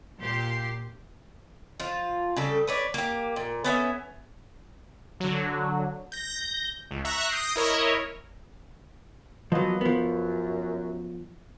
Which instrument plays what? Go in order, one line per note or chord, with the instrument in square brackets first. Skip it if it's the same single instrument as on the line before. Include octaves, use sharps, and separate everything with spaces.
[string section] A#2 G4 C6
[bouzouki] F3 F4
C#3 G3 A4
B4 C#5 D5
A#3 G4
A#2
B3 C#4 E5
[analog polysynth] D3 F#3
G6 A#6
C#2
E5 A#5 C#6 F#6
D#6 G6 A#6 C7 D7
E4 A#4 C#5 D#5
[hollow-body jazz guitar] F3 F#3 [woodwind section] A#3 B3 D#5
[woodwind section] F#2 [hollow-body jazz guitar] F3 B3